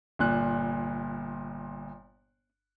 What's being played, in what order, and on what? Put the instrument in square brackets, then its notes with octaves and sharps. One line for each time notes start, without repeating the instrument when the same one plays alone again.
[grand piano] G1 A#2 F#6